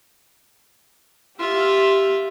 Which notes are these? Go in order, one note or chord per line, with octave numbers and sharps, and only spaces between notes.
F4 G4 E5